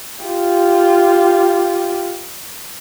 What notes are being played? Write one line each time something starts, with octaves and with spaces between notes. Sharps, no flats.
F4 G4